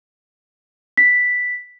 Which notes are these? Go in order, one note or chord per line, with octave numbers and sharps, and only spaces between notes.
B6